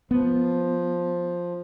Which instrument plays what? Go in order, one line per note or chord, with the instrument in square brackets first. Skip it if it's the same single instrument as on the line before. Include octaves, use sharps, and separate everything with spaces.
[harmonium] F3 [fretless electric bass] B3